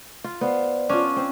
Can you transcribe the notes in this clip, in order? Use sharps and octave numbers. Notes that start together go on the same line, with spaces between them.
F4
B3 C5 D5 F5
C#4 D4 F4
C4